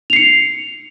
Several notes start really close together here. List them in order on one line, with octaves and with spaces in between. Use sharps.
F7 C7 C#7